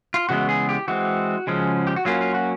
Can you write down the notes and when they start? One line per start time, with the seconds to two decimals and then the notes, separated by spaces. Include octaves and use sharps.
0.14 F4
0.29 C#3 E3 G#3 B3 F#4
0.49 G#4
0.69 G4
0.88 E3 G#3 C4 F#4
1.47 C#3 F3 G#3 C#4
1.87 G4
1.96 F#4
2.05 F#3 A#3 C#4 F4
2.21 F4
2.35 F#4